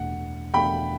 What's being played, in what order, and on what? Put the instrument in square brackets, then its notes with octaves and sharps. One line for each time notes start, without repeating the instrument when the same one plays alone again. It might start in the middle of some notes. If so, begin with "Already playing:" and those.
Already playing: [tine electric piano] E2 B2 A3 D4 [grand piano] F#5
[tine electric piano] E2 B2 A3 D4 [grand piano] G5 B5